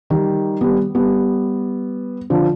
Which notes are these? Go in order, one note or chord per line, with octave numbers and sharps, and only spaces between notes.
D#3 G3
G3 B3
G3 B3
D3 F3